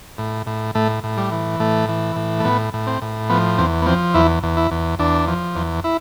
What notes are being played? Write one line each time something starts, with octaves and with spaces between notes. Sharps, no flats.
A2
A2
A2 A3
A2
G3
E3
A2 A3
E3
A2
A3
A2 B3
A2
C4
A2
F3 B3
E2 C4
B3
F3 C4
E2 E4
E2
E4
E2
E2 D4
F3
E2
E4